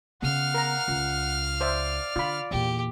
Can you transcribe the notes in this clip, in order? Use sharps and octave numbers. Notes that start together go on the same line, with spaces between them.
C#3 B3 F5 F#5 F6
A#4 A#5
C#2
C5 D5 E5
D3 F4 B5
E2 A#2 G4